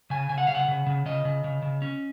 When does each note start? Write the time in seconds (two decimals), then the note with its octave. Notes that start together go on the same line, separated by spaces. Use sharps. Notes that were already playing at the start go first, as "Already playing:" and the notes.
0.10 C#3 G#5
0.29 C#3 G#5
0.38 F#5
0.47 C#3 F5
0.55 F#5
0.68 C#3
0.86 C#3
1.06 C#3 D#5
1.25 C#3
1.44 C#3
1.62 C#3
1.82 C#4